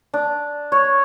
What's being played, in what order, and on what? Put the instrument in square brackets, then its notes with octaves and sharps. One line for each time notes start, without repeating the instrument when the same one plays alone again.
[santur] D4
C#5